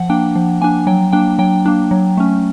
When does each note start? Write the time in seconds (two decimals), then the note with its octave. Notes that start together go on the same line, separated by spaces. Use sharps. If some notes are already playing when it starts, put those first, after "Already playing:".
Already playing: F3 F#5
0.10 A#3 D4 G5
0.35 F3
0.61 A#3 D4 G#5
0.87 F#3 G5
1.13 A#3 D4 G5
1.39 F#3 G5
1.66 A#3 D4
1.91 F#3
2.17 A3 C#4